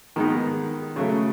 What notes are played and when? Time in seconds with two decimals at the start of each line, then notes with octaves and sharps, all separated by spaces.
0.16 D#3 G#3 B3 D#4
0.96 C#3 F#3 A3